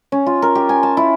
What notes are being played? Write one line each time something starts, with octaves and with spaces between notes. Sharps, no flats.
C#4
F4
A#4
G4
G#5
A5
E4